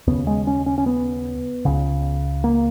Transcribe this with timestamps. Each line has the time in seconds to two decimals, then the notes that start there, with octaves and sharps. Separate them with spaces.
0.07 D#2 C#3 B3
0.27 G#3
0.47 C#4
0.66 C#4
0.78 C#4
0.86 B3
1.65 C#2 C#3
2.44 A#3